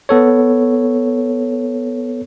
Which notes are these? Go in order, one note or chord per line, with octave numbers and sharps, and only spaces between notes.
B3 A4 C#5